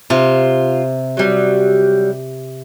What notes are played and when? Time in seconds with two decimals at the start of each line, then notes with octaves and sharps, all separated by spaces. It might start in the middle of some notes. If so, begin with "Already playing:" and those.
0.10 C3 F4
1.17 F#3 G3